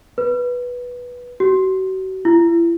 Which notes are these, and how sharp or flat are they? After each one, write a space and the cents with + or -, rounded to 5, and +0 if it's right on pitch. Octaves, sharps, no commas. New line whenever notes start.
B4 -10
F#4 +35
E4 +40